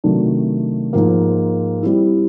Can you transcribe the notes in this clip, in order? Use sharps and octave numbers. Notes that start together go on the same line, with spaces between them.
C3 D#3 F#3 A3 D4
G#2 F3 A#3
G3 C4 E4